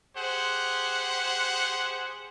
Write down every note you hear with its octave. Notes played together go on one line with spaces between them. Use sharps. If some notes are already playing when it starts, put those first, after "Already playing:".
G4 G#4 C5 F#5